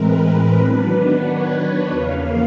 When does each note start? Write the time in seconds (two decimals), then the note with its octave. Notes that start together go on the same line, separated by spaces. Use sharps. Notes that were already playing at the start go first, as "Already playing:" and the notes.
Already playing: A2 E3 G#3 C4 A#4 B4
0.56 D#3 F#3 B3 D4
1.23 C#5
1.56 C#5
1.89 E2 C#3 F3 A#3 F5